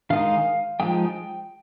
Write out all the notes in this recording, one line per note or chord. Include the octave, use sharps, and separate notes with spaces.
D#3 G#3 D#4 F5
F3 G#3 D#4 G5